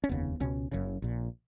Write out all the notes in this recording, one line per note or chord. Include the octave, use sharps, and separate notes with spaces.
C#4
F1 D#2 C#3 B3
C#2 B2 C#4
F#1 F#2 C#3
A#1 A#2